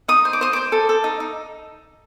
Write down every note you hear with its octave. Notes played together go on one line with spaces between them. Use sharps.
D#4 D#6
C5
D6
C5 D#6
C5 D6
A4
A4
D#4
D#4